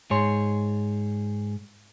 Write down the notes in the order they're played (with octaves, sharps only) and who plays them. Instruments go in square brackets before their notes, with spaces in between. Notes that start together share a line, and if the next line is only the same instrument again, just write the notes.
[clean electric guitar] G#2 G#4 C#5 C6